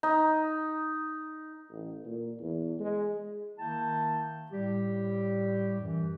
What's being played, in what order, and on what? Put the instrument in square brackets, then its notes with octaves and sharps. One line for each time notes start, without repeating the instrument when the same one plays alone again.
[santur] D#4
[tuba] A1
A#2
E2
G#3
[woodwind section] D#3 A#3 E4 G5 A5
A2 G3 G4
F#2 E3